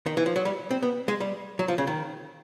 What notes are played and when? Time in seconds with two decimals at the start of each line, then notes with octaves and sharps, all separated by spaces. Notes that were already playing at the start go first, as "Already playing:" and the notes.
0.06 D#3
0.17 E3
0.26 F3
0.36 F#3
0.45 G3
0.71 C4
0.83 B3
1.08 G#3
1.20 G3
1.59 F#3
1.68 F3
1.78 C#3
1.87 D#3